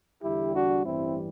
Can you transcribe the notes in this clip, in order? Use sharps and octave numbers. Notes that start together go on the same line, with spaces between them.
E2 D3 G3 E4 G4
D4 F#4
A1 G2 E3 G3 C4 E4